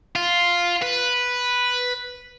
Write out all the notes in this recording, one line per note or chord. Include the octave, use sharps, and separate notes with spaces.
F4
B4